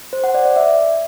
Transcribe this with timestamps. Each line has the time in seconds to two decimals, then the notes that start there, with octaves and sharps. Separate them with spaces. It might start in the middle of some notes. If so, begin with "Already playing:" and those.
0.13 C5
0.24 F#5
0.34 D5
0.45 D5
0.56 E5